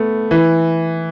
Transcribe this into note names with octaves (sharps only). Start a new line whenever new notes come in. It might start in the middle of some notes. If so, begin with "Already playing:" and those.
Already playing: A3 B3
E3